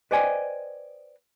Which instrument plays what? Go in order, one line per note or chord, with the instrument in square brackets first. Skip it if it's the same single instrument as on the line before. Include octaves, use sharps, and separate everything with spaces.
[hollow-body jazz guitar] B4 C5 D5 D#5 G5 G#5